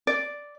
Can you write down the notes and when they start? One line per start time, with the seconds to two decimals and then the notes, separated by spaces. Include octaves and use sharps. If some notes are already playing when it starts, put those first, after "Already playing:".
0.07 D5